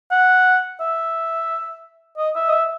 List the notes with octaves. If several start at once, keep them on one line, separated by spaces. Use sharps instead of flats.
F#5
E5
D#5
E5
D#5
E5